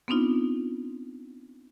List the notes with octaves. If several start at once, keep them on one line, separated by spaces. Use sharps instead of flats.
B3 C4 D4 D#4 F4